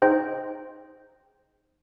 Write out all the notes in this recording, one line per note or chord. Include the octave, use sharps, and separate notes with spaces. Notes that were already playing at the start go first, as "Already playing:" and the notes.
D#4 G#4 C5 D#5 G5